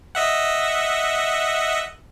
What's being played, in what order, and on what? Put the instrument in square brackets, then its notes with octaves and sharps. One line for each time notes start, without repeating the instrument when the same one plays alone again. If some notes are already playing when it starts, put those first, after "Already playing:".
[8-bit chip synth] D#5 E5 F#5